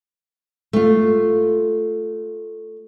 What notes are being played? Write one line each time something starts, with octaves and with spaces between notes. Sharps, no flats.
A3 F4